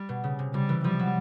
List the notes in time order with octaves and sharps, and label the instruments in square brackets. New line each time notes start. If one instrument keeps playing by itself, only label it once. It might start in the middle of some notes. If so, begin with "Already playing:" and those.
Already playing: [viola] G3
[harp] B2
C#3
C3
[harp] C3 [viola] G3
[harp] E3
[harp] F3 [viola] G3
[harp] F#3